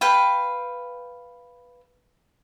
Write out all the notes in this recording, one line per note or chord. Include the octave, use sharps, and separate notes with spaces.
B4 F5 G5